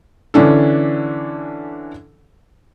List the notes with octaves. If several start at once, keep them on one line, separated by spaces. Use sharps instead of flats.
D3 E3 C#4 D4 A4